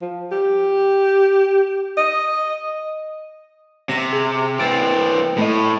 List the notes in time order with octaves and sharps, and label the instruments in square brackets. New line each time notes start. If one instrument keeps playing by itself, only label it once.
[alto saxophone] F3
G4
D#5
[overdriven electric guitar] C3 [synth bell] A#6
[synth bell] G#4
[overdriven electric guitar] E3 C4 [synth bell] A6 D7
[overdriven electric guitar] A2 [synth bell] A3 D#5